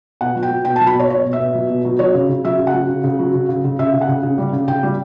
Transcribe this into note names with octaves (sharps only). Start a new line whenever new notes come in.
B2 F#5
F#3
G5
F#3
B2 G5
A5
F#3
B5
B2 C#5
B2 C#5
B2
E5
B2
F#3
B2
F#3
F#3 C#5
C#3
C#3
F#3 E5
C#3
F#5
F#3
C#3
C#3
F#3
C#3
C#3
C#3
C#3 E5
C#3
F#5
C#3
C#3
G3
C#3
C#3 G5
G3